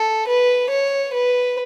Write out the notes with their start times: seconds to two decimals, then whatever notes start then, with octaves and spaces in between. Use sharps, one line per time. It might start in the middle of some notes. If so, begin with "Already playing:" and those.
Already playing: A4
0.27 B4
0.71 C#5
1.13 B4